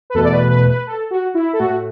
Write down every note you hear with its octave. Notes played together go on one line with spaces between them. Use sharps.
B4
E2 B2 A3 A4
D5
B4
B4
B4
A4
F#4
E4
A4
A2 A3 F#4